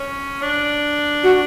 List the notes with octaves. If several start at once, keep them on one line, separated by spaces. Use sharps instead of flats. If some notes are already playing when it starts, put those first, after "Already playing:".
Already playing: C#4
D4
F#4